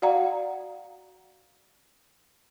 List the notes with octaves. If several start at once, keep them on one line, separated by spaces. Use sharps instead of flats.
F#4 D5 F5 F#5 A#5